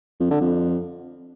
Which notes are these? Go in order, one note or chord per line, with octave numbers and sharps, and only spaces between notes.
F2
D3
F2